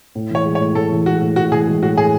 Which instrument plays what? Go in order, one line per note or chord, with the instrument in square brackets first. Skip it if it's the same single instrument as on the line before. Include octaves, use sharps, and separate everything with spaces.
[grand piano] A2
[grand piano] E3 [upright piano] C#5
[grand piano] G#3
[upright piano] C#5
[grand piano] A2
[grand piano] A2 [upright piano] A4
[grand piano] E3
[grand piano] G#3 [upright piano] F#4
[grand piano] A2
[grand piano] A2 [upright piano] F#4
[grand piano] E3 [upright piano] G#4
[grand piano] G#3
[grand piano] A2 [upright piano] F#4
[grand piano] A2 [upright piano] G#4